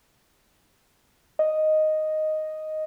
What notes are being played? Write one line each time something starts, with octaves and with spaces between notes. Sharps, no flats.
D#5